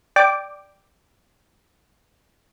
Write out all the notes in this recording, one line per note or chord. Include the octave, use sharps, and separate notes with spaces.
D5 G5 D6